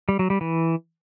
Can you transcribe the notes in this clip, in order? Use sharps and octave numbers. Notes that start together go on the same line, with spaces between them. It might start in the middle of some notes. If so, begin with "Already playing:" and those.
G3
F#3
G3
E3